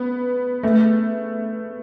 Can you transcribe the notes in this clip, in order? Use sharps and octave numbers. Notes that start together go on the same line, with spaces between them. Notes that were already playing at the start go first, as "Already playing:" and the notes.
Already playing: B3
A3